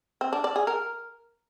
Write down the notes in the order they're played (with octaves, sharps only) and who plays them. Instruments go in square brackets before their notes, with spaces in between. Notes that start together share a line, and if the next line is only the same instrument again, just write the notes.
[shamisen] C4
D4
D5
G#4
A#4